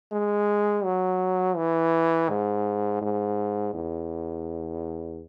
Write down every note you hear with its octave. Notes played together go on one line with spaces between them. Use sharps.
G#3
F#3
E3
G#2
G#2
E2